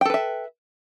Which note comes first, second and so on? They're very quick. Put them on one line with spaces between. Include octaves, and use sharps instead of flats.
G5 A4 B4 E5